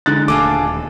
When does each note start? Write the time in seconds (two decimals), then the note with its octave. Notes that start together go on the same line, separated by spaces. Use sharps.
0.06 D3 G#3 D#4 F#6 A6
0.28 D#1 D#2 A3 F4 G#4 A4 D6